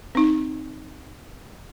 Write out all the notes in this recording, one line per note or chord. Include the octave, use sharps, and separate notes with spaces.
C4 D#4